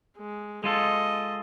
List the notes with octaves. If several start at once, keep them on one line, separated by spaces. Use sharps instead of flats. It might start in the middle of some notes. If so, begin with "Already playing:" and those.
G#3
G#3 F4 A4 D#5